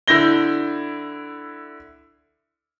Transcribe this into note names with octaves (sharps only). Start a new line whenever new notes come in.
D3 E4 G6 A#6 G7